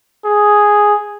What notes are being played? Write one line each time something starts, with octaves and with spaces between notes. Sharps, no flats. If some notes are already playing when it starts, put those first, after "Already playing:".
G#4